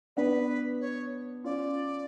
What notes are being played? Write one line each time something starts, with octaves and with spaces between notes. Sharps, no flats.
B3 D4 B4
C#5
C#4 F4 D5